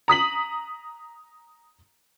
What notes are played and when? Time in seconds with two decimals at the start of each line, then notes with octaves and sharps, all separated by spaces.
0.08 A#5 D#6 B6 F#7